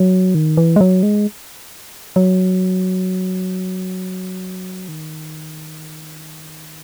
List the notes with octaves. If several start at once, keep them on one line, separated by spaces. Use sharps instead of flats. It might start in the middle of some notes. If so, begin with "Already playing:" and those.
Already playing: F#3
D#3
E3
G#3
F#3
G#3
F#3
D#3